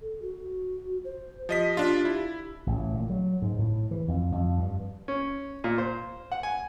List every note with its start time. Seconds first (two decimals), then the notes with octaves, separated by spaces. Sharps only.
0.01 A4
0.22 F#4
1.04 C5
1.49 F3 G4 D#5 B6
1.77 D4 F4
2.05 E4
2.67 A1
2.94 A#2
3.10 F#3
3.42 G#2
3.59 A2
3.91 E3
4.08 F2
4.32 F2
4.58 G2
5.08 C#4
5.64 A#2
5.78 C5
6.32 F#5
6.43 G#5